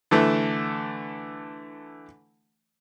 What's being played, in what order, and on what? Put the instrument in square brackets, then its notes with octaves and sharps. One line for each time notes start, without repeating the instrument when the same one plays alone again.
[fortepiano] D3 E3 A3